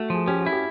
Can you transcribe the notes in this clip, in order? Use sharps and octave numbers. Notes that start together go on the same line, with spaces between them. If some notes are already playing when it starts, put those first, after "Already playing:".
Already playing: A3 F#4
F3 G#4
C#4 G4
F#4
E4
G4